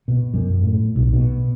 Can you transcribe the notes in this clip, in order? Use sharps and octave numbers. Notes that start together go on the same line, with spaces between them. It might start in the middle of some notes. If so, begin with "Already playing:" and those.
B2
F#2
A2
B1
B2